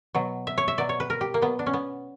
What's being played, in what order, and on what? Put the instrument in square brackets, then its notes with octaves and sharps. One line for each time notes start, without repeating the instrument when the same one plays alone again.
[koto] B2 F#3
E5
C#5
E5
B2 F#3 D5
C#5
B4
A#4
G4
A#3
B2 F#3 B3
D4
C#4
B3